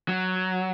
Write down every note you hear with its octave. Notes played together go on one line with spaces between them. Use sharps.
F#3